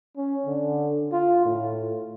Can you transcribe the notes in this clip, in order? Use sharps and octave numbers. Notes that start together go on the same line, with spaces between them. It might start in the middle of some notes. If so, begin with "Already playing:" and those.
C#4
D3
F4
A2